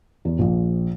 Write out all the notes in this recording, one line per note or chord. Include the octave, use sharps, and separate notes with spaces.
E2
A#1